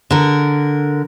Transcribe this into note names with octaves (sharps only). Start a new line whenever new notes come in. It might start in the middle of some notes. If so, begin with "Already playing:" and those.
D3 A#4